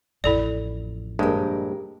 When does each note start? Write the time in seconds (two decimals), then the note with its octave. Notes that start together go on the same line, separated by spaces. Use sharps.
0.24 A1 F2 E4 A4 D5
1.19 A#1 G2 G#3 G4 A#4